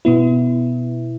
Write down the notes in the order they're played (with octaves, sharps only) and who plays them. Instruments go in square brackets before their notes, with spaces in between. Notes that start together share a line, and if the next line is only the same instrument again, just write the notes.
[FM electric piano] B2 B3 E4